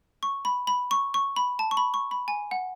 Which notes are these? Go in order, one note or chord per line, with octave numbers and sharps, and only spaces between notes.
C#6
B5
B5
C#6
C#6
B5
A5
C#6
B5
C#6
B5
G#5
F#5